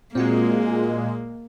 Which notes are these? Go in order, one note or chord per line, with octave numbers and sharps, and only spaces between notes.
A#2 G#3 A#3 C4 F#4